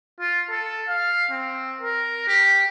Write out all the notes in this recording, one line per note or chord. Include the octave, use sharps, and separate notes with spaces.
F4
A4
F5
C4
A#4
G4